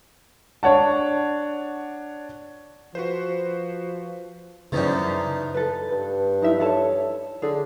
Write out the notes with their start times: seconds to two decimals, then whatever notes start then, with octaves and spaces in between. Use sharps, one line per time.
0.63 D4 C#5 F#5 A5
2.95 F3 F#4 B4 C5
4.72 F#2 C#3 E3 F3 D4 D#4
5.54 A4 B4
5.91 G2
6.42 D#4 E4 E5
6.60 A4 C#5 A5
7.42 D3 G#4